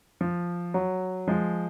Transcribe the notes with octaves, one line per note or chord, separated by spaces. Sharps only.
F3
F#3
F3 G#3